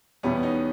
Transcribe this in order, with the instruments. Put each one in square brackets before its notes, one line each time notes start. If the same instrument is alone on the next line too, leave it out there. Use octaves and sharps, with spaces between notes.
[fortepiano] E2 B2 G3 [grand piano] B3 C#4
[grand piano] C#4 D#4